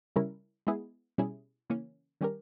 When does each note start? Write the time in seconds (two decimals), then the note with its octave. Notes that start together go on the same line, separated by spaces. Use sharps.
0.16 C#3 G3 C#4 E4 A#4
0.67 G#3 B3 E4 G#4
1.18 B2 G3 C#4 E4 G#4
1.70 C#3 E3 A#3 C#4
2.21 D#3 G3 C#4 G4 A#4